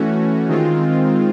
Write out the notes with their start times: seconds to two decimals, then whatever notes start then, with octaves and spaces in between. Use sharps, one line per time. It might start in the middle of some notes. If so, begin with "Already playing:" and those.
Already playing: E3 A3 C#4 F#4
0.49 D#3 G#3 C4 F4